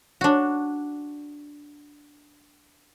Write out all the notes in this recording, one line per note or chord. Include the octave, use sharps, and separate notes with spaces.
D4 F#4